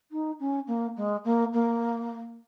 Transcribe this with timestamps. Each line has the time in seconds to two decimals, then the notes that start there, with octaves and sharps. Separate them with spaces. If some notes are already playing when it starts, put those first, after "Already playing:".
0.11 D#4
0.39 C#4
0.67 A#3
0.96 G#3
1.24 A#3
1.53 A#3